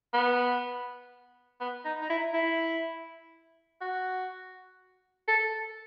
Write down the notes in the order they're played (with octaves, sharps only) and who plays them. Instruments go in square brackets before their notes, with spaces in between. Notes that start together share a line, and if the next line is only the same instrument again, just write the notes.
[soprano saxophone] B3
B3
D#4
D#4
E4
E4
F#4
A4